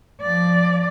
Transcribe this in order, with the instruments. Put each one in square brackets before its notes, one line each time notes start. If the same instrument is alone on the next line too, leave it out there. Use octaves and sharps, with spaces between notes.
[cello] F3 D5